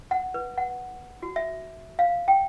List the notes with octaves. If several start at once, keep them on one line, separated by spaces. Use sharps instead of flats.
F#5
B4
F#5
F#4
E5
F5
G5